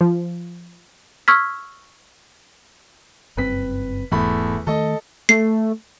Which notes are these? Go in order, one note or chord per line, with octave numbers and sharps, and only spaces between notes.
F3
C#6 E6 F6 G#6 B6
F#1 G2 C4 B4 B6
E1 E2 G#2 E3 A3 B5
D#3 A3 A4 D#5
A3 C7